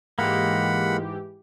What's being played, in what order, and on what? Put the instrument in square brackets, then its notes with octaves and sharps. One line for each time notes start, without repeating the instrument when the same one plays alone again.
[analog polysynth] G#2 E3 G4 [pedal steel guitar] G#3 A#3 [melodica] F#5 B5